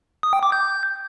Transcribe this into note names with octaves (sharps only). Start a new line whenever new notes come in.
D#6
G5
D6
G6